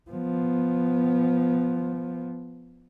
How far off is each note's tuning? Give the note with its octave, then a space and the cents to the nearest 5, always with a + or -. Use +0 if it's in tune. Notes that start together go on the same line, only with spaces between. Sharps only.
F3 +0 B3 +0